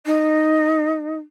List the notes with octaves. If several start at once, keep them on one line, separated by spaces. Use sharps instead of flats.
D#4